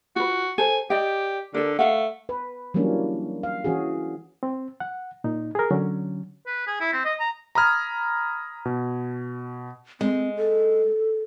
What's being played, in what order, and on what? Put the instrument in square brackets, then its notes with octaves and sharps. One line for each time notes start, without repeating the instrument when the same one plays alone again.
[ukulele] F4 B4 [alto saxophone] F#4
[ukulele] A4 C5 [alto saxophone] G#5
[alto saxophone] G4 [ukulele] D5 D#5 G5
[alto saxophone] D3 [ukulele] A4 A#4
[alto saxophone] A3 [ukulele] F5 F#5
[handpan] B4
E3 F#3 G3 A#3 C#4 D4
F5
E3 C#4 F#4 G#4
[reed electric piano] C4
F#5
A#2 D#4
G#4 A#4
D3 F#3 C#4
[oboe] B4
G#4
E4
C4
D#5
A#5
[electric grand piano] A#5 B5 D#6 F6 G#6
B2
[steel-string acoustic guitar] G#3 [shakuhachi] C4
[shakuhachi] A4